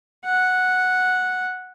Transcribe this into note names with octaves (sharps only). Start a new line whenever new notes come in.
F#5